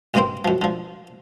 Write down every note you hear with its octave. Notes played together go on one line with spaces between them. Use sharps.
A1 G2 C3 A#3 C4 C5
F#2 F3
D3 F3